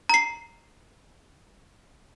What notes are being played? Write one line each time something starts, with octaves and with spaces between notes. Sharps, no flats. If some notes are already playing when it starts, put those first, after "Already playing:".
A#5 C7